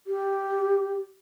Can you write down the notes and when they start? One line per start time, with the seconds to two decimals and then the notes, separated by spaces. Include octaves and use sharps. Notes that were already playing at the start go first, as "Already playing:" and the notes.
0.07 G4